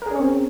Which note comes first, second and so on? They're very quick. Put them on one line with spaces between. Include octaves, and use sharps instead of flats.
A#4 G#4 C#4 C#5 C4